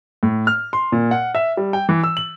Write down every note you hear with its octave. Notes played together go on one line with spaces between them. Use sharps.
A2
F6
C6
A#2
F#5
E5
G3
G5
E3
E6
F#7